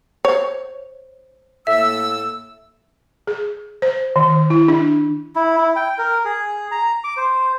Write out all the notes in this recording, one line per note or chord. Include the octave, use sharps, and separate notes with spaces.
C5 C#5
A2 A#3 E5 E6
G#4
C5
D#3
E4
D4
E4
E4
G5
A#4
G#4
A#5
D6
C5